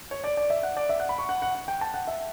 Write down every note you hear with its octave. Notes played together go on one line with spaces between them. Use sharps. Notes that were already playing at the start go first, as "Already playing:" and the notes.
C#5
D5
D5
E5
F#5
D5
E5
F#5
B5
C#6
F#5
F#5
F#5
G5
A5
F#5
E5